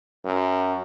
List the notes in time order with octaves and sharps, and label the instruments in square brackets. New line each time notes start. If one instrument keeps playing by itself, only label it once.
[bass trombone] F#2